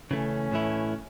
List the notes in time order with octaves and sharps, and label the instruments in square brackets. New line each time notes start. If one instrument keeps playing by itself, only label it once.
[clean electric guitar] C#3 E3 A3 [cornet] C#4
[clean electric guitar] A2 E3 A3 E4